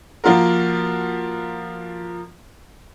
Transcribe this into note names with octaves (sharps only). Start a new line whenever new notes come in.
F3 A#3 F4 F#4 A#4